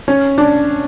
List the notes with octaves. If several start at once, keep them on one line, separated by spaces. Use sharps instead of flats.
C#4
D4